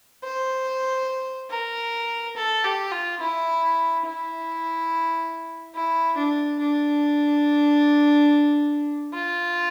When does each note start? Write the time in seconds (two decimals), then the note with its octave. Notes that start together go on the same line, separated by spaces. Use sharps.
0.24 C5
1.50 A#4
2.36 A4
2.64 G4
2.92 F4
3.21 E4
4.06 E4
5.75 E4
6.17 D4
6.59 D4
9.14 F4